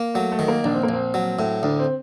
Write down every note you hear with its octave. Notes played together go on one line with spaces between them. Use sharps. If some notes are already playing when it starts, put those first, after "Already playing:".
Already playing: A#3
F#3 A3
A3
D#3
A#3
A#1 D4
C4
A#3
A#1 C4
F#3
A2
D2 D4
C4